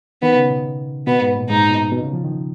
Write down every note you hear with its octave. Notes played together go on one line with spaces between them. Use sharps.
D#3 B3
C#3
B2
B2 B3
G#2
A#2
G#2 D#4
B2
B2
C#3
F3
D#3